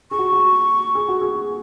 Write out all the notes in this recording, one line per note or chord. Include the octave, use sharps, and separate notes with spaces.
G#4 C#6
F#4
F#4
G#4
F#4
G#4